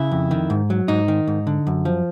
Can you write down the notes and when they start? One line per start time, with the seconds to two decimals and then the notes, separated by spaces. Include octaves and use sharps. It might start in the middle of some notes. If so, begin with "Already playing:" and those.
Already playing: C#3 E4
0.11 F2
0.31 D#3
0.50 G#2
0.70 F#3
0.88 G#2 D#4
1.08 D#3
1.27 G#2
1.47 D3
1.67 F#2
1.85 F3